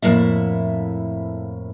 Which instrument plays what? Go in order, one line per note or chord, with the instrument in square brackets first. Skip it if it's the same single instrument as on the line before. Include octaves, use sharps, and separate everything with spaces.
[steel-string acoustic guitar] F2 A2 D#3 A#3 E4 E5